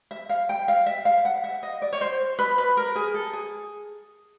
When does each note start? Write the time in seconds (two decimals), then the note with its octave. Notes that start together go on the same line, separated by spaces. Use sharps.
0.11 E5
0.29 F5
0.49 G5
0.68 F5
0.86 E5
1.05 F5
1.25 F#5
1.44 E5
1.63 D#5
1.82 D5
1.93 C#5
2.01 C5
2.39 B4
2.58 B4
2.77 A#4
2.95 G#4
3.14 A4
3.33 G#4